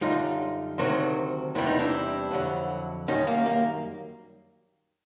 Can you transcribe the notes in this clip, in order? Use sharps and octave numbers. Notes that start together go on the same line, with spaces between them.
F#2 D3 G3 D#4 F4
D2 C3 D#3 F#3
E2 C3 E3 G3 E4
D#4
D4 E4
F2 D3 F#3
F#2 D#3 G3 C#4 D#4
A#3
A#3